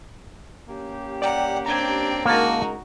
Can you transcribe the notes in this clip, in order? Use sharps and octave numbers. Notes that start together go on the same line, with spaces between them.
A#3 C#4 G4
D5 F#5 G5 A#5
C4 D4 A#5 G#6
C#3 G#3 A#3 D#4 F#4 A#4 A5